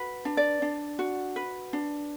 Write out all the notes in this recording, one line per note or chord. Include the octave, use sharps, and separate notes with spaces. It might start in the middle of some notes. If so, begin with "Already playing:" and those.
Already playing: F#4 B4
D4
D5
D4
F#4
B4
D4